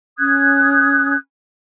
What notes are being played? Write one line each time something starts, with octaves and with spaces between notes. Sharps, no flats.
C#4 D#6 F#6 G#6